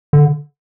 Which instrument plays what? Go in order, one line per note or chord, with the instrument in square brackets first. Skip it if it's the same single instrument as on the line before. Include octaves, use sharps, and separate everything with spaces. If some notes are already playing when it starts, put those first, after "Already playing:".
[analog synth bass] D3